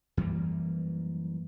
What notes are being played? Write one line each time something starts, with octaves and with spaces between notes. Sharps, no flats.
F#2 E3 G3 A#3